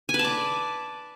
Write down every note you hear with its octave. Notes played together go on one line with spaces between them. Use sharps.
G#5
B4
A5
D5